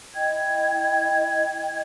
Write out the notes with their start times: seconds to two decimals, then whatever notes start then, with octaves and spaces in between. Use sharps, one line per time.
0.16 E4 D#5 G5 G#6